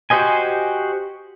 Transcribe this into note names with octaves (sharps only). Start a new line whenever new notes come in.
F#4 G4 C5 D#5 G#5